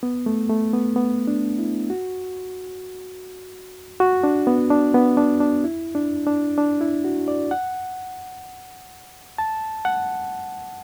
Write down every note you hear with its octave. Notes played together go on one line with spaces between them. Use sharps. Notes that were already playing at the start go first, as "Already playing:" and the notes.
B3
A3
A3
B3
B3
D4
E4
F#4
F#4
D4
B3
D4
B3
D4
D4
E4
D4
D4
D4
E4
F#4
D5
F#5
A5
F#5